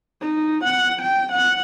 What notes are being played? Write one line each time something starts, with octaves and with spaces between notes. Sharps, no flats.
D#4
F#5
G5
F#5